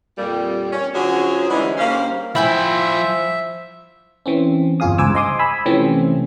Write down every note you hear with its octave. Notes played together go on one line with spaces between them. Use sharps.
F2 A#2 G3
C#4
D3 F3 F#3 C#4 F#4 G#4
D3 E3 G3 G#3 C#4 D#4
G2 A#3 C#4 C5 F5
F3 E4 C5 E5 G5 G#5 B5
E3 C4 C#4
G1 E2 F4 G#4 F5 D#6
C#2 G2 C5 G#5 D6 E6
D#5 G#5 C6 D6 D#6
G#5 B5 E6
C3 E3 F3 A3 C4 C#4